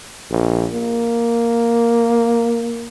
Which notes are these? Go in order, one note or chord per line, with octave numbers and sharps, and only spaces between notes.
A#1
A#3